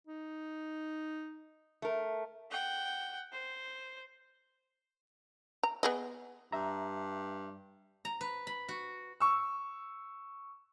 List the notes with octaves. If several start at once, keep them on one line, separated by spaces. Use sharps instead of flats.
D#4
A3 A#4
F#5 G5
C5
A#5
B3 G#4 D#5
G2 E5 A#5
A#5
B4
B5
F#4
C#6 E6